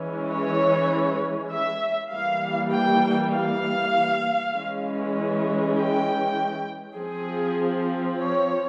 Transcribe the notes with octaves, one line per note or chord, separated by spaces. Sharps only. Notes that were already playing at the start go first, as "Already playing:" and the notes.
Already playing: E3 G#3 C#4
C#5
E5
E3 G3 A#3 F5
G5
F5
E3 G#3 C#4
G5
F3 C4 G#4
C#5